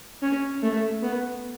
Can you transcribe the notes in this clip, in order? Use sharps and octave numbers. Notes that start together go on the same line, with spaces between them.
C#4
A3
B3